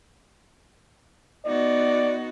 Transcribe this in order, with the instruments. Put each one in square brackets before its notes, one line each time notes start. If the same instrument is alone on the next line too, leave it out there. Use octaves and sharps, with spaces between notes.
[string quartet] B3 D#4 F#4 [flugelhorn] D5